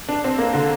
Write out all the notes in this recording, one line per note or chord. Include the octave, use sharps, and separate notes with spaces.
D4
C4
A#3
D3